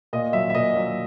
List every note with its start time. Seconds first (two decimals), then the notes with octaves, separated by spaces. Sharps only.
0.13 A#2 D#5
0.33 F#3 E5
0.50 E5
0.55 A#2 D#5
0.76 F#3